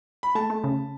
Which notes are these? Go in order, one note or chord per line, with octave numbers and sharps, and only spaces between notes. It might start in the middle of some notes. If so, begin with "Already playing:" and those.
B5
A3 A5
A3
C#3